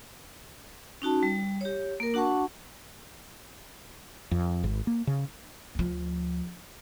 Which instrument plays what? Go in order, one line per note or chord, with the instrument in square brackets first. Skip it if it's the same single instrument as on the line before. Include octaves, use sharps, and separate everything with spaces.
[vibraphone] C#4 D#4 F#4 A5
G3
G4 C#5
A#3 A#4
D4 F#4 F#5 A5 C#6
[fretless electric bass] F2
G#1
A#3
C#3
[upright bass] D2 F3